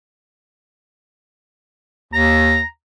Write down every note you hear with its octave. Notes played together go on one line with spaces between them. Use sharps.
D#2 A#5